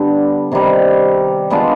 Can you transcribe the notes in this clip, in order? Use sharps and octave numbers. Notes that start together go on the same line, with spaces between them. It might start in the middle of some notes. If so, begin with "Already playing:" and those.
Already playing: D3 G3 B3
C3 D#3 G3
G#3 B3 D4 F4